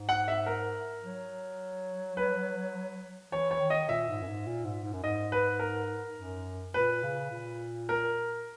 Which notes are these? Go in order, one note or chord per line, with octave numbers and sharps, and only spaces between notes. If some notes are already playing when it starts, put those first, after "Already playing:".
Already playing: G#2
F#5
E5
A#4
F#3
B4
E3 C#5
C#5
D#3
D#5
A#2 E5
G#2
F#2
G#2
A#2
G#2
G#2
F#2
G#2 D#5
B4
A#4
F#2
A#2 B4
C#3
A#2
A#4